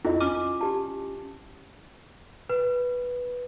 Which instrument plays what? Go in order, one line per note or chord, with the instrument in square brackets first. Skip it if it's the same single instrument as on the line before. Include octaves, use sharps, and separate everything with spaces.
[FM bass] F2 [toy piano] E4 F4 D#5
[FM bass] C#4 [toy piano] D6
[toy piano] G4 A5
[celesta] B4